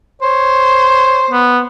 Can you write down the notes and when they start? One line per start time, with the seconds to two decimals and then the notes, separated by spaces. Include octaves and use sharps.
0.22 C5 C#5
1.30 B3